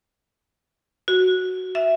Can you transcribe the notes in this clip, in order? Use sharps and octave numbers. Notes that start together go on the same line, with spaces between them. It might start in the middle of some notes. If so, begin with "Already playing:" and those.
F#4
E5